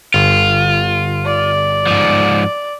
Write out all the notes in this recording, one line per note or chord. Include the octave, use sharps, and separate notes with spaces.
G1 F4
D5
G#2 F3